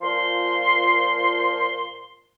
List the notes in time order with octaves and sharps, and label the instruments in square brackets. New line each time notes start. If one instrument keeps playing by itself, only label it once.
[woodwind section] A#2 F3 C6